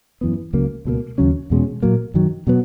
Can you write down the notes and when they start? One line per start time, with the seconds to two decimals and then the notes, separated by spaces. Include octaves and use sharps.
0.21 F#2 E3 B3
0.53 C#2 C#3 F#3 A#3
0.85 C#2 B2 F#3 A#3
1.18 D#2 C#3 F#3 C#4
1.50 E2 B2 G#3 C#4
1.83 A#2 F#3 A#3
2.14 F#2 D#3 F#3
2.47 B2 F#3 B3